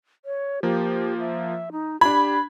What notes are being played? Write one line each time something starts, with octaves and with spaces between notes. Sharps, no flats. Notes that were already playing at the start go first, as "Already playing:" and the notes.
C#5
F3 A#3 G4
E5
D#4
D4 G4 B5 G#6